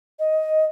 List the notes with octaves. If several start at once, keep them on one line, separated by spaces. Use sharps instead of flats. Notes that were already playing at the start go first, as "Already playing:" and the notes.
D#5